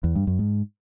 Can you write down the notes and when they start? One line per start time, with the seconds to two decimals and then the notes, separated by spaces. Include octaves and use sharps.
0.04 E2
0.15 G2
0.27 F#2
0.39 G#2